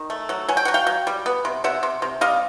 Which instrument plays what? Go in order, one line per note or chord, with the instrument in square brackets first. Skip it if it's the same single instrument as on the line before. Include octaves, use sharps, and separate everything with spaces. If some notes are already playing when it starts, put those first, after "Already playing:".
Already playing: [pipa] D#3
A3
F#3
F#3 G#5
G5
F#3 F#5
F5 G5
F#3
G3
B3
C3
C3 E5 F#5
C3
C3
G3 D#5 F5